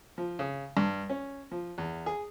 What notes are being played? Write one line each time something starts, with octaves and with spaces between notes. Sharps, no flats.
F3
C#3
G2
C#4
F3
E2
G#4